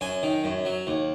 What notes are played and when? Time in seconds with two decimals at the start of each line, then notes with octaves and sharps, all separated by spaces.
0.01 F#2 G#5
0.23 D#3
0.44 F#2
0.65 F#3
0.87 D#2